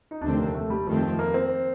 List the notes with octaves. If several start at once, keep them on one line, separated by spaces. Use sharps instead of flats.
D#4
F1 D#2 D3 A3 C4 D4
A#3
A3
G3
F2 D#3 F3 A3 C4
F3
A#3
C4